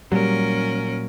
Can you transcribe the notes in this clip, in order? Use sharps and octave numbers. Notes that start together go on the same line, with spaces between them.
A#2 F#3 G3 C#4 A#4